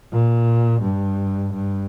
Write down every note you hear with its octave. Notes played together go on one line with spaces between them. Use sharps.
A#2
G2
G2